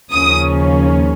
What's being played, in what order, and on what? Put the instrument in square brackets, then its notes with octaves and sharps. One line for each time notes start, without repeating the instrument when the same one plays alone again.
[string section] D#2 C#3 F3 A#3 C#4 D#6